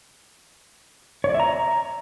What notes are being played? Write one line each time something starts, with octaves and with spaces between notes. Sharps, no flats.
C#5
D5
E5
A#5